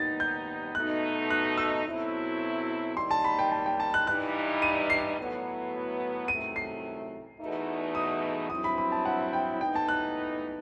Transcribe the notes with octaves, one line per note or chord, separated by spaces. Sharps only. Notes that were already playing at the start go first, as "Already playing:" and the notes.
Already playing: D#2 D#3 G3 B3 D#4 A6
G6
B2 A3 D#4 F#6
F#6
E6
B2 F#3 A3 C4 E4
D#2 D#3 G3 D#4 C6
A5
B5
G5
A5
G5
A5
F#6
G2 E3 G3 D#4 F#6
D#7
C7
A2 F#3 B3 E4
C2 C3 D#3 F#3 A3 D#7
C7
E2 B2 A3 D#4
D#6
G2 F#3 C4 E4 D#6
B5
B5
A5
F#5
G5
A2 E3 G3 B3 D#4 G5
A5
F#6